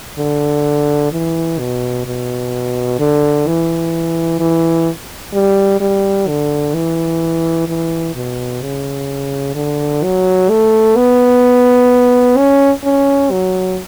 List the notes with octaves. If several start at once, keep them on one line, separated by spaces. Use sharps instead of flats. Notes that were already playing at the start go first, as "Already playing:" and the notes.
D3
E3
B2
B2
D3
E3
E3
G3
G3
D3
E3
E3
B2
C#3
D3
F#3
A3
B3
C#4
C#4
F#3